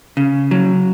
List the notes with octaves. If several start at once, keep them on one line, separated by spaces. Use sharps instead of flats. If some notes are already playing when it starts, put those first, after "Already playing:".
C#3
F#3